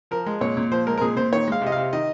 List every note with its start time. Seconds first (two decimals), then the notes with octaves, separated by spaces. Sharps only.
0.11 F3 A#4
0.26 G#3
0.41 A#2 C#5
0.57 A#2
0.72 F3 C5
0.87 G#3 A#4
0.98 A#4
1.01 A#2 G#4
1.16 A#2 C5
1.33 D#3 C#5
1.48 G#3 F5
1.62 C3 D#5
1.72 C3 F5
1.93 D#3 D#5